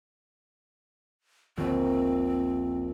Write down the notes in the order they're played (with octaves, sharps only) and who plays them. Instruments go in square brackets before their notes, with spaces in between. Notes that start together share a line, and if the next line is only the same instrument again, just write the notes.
[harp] D#1 A#1 [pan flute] C4